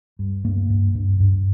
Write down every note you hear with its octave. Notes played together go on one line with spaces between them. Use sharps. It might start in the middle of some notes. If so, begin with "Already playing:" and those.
G2
G2 A#3
G2
G2
G2